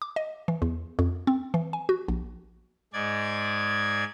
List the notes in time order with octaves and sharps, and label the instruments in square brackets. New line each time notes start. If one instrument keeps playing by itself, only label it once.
[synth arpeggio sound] D6
D#5
E3
E2
F2
C4
E3
G#5
F#4
A#1
[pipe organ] G#2 G#3 D5 G#6